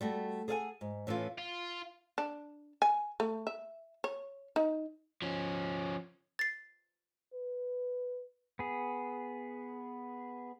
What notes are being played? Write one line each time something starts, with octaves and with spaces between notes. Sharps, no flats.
G3 A3 F#4
G#4 A4 D5 F5 F#5 G#5
G#2
A2 E3 C#4 F4
F4
D4
G#5
A3
E5
C#5
D#4
F3 C#4
A6 C7
B4
B3 G#4